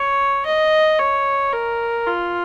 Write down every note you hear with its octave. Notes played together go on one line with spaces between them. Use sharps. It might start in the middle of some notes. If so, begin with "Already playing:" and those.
Already playing: C#5
D#5
C#5
A#4
F4